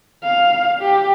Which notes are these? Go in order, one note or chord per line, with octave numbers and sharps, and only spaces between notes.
F5
G4